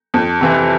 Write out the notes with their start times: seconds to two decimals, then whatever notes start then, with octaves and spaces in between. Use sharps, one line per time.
0.14 F2
0.41 C3 E3